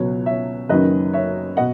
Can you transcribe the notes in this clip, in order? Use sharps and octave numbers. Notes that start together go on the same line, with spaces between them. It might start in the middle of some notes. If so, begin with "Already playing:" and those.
Already playing: C#2 B2 F#3 B3 C#5
C#5 E5
F#1 F#2 D#3 F#3 C#4 B4 D#5
C#5 E5
B2 D#5 F#5